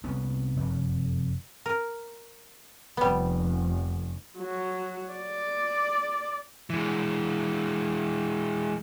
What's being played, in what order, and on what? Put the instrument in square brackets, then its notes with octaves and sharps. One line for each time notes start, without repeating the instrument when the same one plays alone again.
[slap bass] C2 C3 B3 C#4
F1 F#2
[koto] A#4
[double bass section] F1 [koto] G3 B3
[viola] F#3
D5
[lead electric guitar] E3 G#3